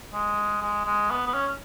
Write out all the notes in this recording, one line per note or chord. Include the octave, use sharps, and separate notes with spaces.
G#3
G#3
G#3
B3
B3
C#4